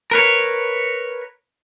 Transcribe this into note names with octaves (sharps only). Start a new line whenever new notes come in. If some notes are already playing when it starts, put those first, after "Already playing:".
A#4 B4 C#5